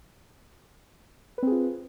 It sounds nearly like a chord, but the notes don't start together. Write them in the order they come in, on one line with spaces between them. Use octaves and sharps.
B4 C4 G#4 F4